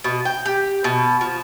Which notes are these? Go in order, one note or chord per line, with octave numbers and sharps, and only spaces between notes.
B2
G5
G4
B2
F3